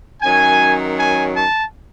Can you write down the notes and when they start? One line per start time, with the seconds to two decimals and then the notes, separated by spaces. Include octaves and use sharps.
0.21 F#2 D#3 F#3 C#4 G#5
0.98 G#5
1.36 A5